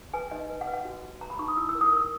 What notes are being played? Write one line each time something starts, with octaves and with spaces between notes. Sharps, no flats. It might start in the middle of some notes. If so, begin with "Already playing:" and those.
B4 G#5
D#4 D#5
B4
F#5
B4
F#5
F#4
F#4
B4 A#5
B5
D#4 C#6
D#6
E4 E6
E6
A#4
D#6
A#4 E6